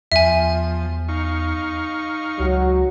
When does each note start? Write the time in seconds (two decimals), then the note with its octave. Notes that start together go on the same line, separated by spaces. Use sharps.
0.12 E2 F3 E5 G#5
1.09 D#4 F5 C#6
2.39 C#2 F#3